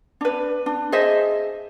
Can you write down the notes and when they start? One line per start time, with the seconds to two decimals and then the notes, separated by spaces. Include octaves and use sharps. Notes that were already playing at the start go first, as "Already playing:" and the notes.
0.21 D4 B4
0.66 D4
0.92 G#4 C5 D#5 E5